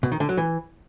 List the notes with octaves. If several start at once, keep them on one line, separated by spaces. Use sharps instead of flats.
B2
D#3
D3
F#3
E3